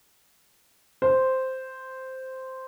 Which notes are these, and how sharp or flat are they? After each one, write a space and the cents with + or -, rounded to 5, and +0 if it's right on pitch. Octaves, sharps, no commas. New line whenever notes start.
C5 -5